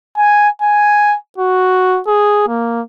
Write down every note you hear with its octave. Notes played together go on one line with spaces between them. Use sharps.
G#5
G#5
F#4
G#4
A#3